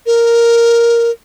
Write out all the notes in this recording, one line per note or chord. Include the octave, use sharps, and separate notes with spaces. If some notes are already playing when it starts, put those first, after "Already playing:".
A#4